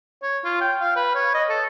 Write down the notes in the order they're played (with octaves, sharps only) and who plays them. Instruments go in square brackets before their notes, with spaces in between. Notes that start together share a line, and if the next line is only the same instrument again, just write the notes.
[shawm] C#5
F4
G5
F5
B4
C#5
D#5
A4